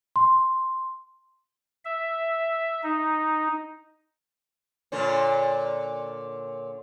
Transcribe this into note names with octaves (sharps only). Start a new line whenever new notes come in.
C6
E5
D#4
A#2 D3 C#4